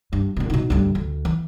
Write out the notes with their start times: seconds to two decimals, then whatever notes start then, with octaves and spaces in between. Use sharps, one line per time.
0.13 G2
0.37 A#1 B2
0.50 B2 D#4
0.70 D2 G2
0.95 D2
1.25 E3